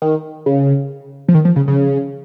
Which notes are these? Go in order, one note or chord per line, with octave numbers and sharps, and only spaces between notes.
D#3
C#3
F3
D#3
F3
C#3
C#3